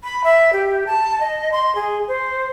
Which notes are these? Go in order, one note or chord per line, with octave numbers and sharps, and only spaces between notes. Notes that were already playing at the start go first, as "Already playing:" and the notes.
B5
E5
G4
A5
D#5
C6
G#4
C5